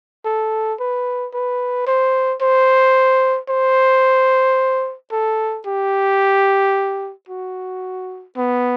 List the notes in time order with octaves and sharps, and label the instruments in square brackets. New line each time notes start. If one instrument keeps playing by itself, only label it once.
[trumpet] A4
B4
B4
C5
C5
C5
A4
G4
F#4
B3